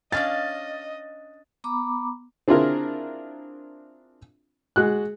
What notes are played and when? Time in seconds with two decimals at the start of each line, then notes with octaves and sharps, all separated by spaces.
0.12 C#4 D4 D5 D#5 F5 A6
1.64 B3 A#5 B5 D6
2.48 C4 D4 E4 F4 G#4 A#4
4.76 G#3 F#4 F#6